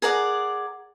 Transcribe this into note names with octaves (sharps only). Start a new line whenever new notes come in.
G#4 A#4 D5 F#5